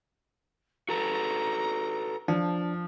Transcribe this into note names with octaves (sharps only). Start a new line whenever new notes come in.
F#4 A4 B4 A#5
F3 D4